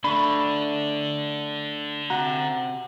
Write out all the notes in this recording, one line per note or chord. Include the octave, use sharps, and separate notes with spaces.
D3 A3 D4 B5 C#6
C3 F#4 A#5